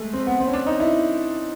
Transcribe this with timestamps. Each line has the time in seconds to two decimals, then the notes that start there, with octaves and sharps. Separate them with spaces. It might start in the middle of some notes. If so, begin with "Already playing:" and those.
Already playing: G#3 A3
0.13 C4
0.27 B3
0.40 C4
0.47 C#4
0.54 D4
0.67 D#4
0.80 E4